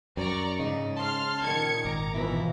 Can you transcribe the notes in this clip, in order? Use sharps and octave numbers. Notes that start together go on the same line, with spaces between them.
F#2 D5 A#5 C#6
G#2 C#3 D#4
A5 C6 F6
A#2 D#3 G#6 C#7
G#1 A#5 D6
B2 E3 F3 E4